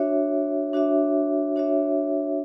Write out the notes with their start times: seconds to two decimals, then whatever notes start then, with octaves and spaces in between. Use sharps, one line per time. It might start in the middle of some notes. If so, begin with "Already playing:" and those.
Already playing: D4 F#4 C#5 E5
0.73 D4 F#4 C#5 E5
1.56 D4 F#4 C#5 E5